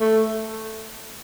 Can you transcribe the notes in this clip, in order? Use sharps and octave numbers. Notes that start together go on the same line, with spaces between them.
A3